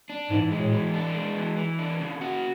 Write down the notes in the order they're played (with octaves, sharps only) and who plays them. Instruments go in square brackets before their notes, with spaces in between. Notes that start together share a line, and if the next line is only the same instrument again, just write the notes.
[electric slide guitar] D4
[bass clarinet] G#2 [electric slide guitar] E3
[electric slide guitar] G#3
[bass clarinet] A2
[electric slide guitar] E3
D4
G#3
E3
E3
D4
C#3
F#4